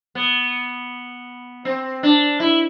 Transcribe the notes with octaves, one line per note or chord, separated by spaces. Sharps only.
B3
C4
D4
E4